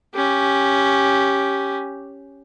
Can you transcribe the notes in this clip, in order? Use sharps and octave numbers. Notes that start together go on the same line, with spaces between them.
C#4 G4